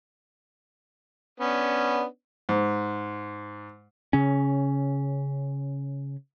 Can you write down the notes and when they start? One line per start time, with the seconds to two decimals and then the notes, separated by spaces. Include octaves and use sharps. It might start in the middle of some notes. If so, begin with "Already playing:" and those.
1.40 B3 C#4 D4
2.49 G#2
4.13 C#3 C#4